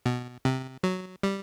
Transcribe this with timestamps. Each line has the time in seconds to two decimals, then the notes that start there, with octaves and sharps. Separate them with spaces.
0.06 B2
0.45 C3
0.83 F#3
1.23 G3